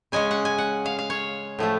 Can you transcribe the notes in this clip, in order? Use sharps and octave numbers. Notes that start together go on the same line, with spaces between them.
C#3 G#3 C#4 G#5
F#5
G#5
F#5
F5
F5
C#5
A2 F3 A3